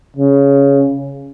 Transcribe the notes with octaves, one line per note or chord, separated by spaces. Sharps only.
C#3